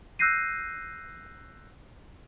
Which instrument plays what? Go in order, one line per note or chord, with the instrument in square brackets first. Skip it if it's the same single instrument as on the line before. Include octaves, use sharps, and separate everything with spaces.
[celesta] E6 F#6 G6 A#6 C7 D#7